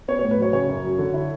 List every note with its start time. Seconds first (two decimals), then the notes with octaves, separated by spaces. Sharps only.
0.08 B3 C#5
0.19 A2 C#5
0.31 B4
0.38 F#3 C#5
0.53 C#3 C#5
0.69 F#2
0.84 F#3
0.99 D3
1.14 E4